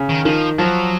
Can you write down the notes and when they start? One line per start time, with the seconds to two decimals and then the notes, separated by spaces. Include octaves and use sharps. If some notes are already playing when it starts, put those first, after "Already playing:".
Already playing: C#3
0.09 D#3
0.25 D#3 F3
0.58 F3 F#3